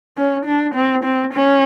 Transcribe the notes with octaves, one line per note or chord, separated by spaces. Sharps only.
C#4
D4
C4
C4
C#4